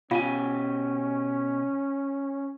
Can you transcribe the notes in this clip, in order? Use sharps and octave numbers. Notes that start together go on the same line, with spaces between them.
B2 C#4 F4 G4 F5 G#5